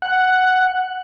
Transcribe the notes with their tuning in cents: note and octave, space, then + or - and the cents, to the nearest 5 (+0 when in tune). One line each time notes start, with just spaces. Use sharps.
F#5 +5